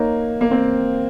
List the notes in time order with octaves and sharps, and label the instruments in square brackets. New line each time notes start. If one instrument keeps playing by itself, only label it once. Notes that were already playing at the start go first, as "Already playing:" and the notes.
Already playing: [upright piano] A#3 [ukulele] D#4 A#4 C#5
[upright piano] A#3
C4